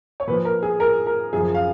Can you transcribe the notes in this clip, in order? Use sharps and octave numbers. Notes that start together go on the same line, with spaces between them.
C#5
A#2 F3 B4
A#4
G#4
A#4
A#4
F#2 C#3 F3 G#4
F5